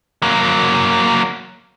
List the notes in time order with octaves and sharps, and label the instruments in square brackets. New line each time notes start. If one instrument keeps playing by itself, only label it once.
[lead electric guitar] F#3 A#3